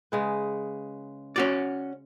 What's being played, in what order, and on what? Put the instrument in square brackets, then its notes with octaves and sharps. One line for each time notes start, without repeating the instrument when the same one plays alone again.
[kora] C#3 G#3 B4
[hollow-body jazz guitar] C#4 F#4 D5